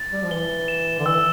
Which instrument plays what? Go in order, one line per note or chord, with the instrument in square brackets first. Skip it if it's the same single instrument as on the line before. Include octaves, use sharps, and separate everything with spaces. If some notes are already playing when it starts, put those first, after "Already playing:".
Already playing: [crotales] A6
[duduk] G3
F3
[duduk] E3 [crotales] G7
[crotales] E7
[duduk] D3
[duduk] E3 [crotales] E6